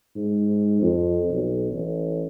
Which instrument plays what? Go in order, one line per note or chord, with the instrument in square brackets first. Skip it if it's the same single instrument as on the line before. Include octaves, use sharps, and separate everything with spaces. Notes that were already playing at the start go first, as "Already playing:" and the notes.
[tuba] G#2
F2
B1
A1